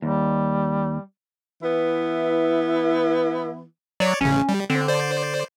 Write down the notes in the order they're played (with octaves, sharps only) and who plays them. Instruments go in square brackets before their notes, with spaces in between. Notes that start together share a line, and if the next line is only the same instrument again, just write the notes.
[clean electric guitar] D#2 [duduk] G3
[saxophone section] E3 B3 E4
[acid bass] F#3 [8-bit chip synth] C#5 D5
[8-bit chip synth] A1 C#3 [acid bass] C#4
[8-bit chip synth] G3
[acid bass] D3 [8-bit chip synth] C4
[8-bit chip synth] C5 D5